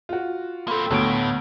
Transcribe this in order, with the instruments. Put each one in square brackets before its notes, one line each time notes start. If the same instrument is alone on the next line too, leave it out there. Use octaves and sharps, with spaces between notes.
[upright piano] F4 F#4
[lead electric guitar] A#3 C4 [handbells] A4 B5 C6
[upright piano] D2 [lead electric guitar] A2 [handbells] B3 C#5 D7